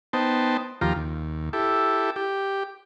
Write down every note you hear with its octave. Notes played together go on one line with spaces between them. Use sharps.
B3 D#4 C5 G5 A5
D#2 F3 F4 G4 A#5
D#2
E4 G4 A4
G4